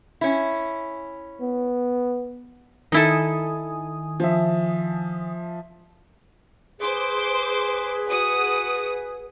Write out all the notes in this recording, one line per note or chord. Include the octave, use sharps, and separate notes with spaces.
C#4 E4
B3
D#3 D#4 E4 A4 G#5 D#6
F3 E5
G#4 B4 C5 C6 D6
F#4 D#6